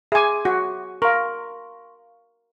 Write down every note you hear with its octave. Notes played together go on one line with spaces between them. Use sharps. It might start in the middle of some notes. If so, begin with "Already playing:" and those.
G#4 E5 G#5 C6 D6
F#4
A#4 F5 C6 C#6